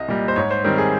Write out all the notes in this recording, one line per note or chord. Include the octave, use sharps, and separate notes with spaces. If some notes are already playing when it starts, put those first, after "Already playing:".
Already playing: C2 D#5
A#2 G3
C5
G#2 C#5
C5
D#3 G3 C4 A#4
G#4